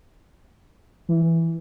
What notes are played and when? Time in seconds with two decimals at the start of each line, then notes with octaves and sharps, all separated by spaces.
1.09 E3